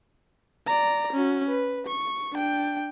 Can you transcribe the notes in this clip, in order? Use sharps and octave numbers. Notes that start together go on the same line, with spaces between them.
D5 A#5
C#4 F#4
B4
C#6
D4 G5